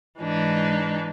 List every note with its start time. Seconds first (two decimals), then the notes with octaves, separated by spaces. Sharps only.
0.20 G#2 E3 D4 D#4